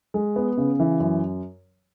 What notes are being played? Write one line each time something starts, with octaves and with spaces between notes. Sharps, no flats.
G#3
B3
C#3
E3
F#2